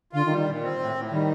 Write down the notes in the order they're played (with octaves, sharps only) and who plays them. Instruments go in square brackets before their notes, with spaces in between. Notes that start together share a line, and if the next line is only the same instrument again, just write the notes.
[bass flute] D3 [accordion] F4
[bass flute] D#3
[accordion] G3
[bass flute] D#3
[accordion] A#2
C4
A2
A2
[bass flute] D#3 [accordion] G3